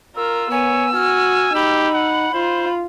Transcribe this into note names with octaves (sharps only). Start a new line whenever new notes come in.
F4 A#4 E6
B3 C#5 G#5
F#4 G#5 F6
D#4 G4 B5
F#5
F4 C5